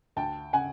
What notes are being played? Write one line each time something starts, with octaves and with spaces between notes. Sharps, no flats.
D2 G5 A5
C#3 F#5 G#5